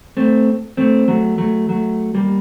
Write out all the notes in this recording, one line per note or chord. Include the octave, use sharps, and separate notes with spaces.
A3 C4
A3 C4
F#3 A3
F#3 A3
F#3 A3
G3 A#3